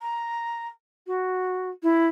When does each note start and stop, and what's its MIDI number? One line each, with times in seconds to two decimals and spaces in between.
0.02 0.68 82
1.07 1.69 66
1.83 2.07 64